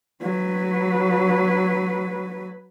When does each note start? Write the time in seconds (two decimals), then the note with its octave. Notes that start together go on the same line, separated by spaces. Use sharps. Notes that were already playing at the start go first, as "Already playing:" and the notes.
0.22 F#3 B4